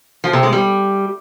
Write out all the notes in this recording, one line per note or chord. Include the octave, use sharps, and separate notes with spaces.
F3
C3
G#3
G3